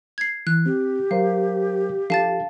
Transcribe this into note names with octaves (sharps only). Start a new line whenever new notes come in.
G#6 C7
E3 F#6
C4 G4
F#3 A#4 C5 F5
F3 D4 A4 F5 A5 A6